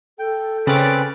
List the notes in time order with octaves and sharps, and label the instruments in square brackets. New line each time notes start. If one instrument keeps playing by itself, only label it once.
[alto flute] A4 [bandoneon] G5
[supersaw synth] C#3 [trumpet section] G3 D5 [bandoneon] C4 C#4 B4